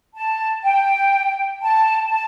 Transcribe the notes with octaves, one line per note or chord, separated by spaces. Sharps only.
A5
G5
A5
A5